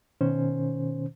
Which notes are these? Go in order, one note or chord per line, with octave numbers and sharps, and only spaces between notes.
B2 D#3 C#4 C5